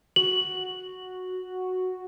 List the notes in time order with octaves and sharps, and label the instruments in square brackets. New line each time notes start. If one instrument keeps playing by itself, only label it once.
[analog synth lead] F#4 [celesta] F#7